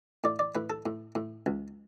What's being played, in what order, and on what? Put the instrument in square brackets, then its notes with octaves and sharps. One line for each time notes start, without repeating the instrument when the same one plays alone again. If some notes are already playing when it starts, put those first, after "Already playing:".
[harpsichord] A2 D5
D5
A2 B4
A4
A2
A2
C#2